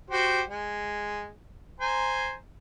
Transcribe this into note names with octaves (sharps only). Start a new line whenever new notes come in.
F#4 G4 C5
G#3
C5 G#5 A#5